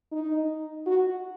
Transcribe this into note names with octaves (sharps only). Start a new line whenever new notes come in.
D#4
F#4